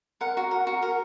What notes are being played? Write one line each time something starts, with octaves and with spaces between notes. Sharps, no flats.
A#4 F#5
F#4
A#4
F#4
A#4